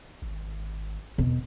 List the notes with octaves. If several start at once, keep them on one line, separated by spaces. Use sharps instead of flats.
G#1
E2 B2